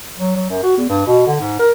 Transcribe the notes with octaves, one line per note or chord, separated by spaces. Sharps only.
F#3
F#3
F#2
F#4
E2
G2
B2
D3
G#2
A#4